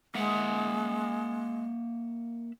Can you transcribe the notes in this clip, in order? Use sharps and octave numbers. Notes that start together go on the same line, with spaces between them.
G#3 A#3 E5 F#5